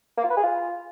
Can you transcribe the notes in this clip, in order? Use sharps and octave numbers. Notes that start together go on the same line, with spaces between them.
A#3
F4
B4
G#4
F4